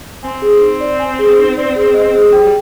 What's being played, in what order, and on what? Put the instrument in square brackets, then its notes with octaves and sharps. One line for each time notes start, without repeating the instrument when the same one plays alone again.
[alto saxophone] C4 [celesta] G#5
[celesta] G#4
D#4
D5
G#5
G#4
D#4
D5
G#4
D#5
G#4
[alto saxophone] F3 [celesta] G5
[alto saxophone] G3